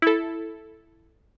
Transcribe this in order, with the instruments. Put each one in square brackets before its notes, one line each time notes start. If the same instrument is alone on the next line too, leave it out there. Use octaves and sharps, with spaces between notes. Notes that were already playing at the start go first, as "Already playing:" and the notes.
[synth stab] E4 A4